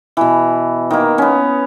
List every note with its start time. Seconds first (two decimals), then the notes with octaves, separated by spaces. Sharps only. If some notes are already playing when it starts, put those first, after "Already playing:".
0.17 B2 E3
0.90 D#3 A#3
1.18 B3 C#4